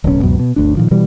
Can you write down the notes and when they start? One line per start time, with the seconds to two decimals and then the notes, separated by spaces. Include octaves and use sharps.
0.04 D1 B1 C#3 C#4
0.21 C#2 F#2 B2
0.39 B2
0.56 G1 D2 D4
0.77 A#2 D#3 F3
0.91 B2 E3 G3